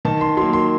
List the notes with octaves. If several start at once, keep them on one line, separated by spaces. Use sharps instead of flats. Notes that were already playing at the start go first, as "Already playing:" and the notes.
D#3 A5
C6
F#3 A#3 C6
C6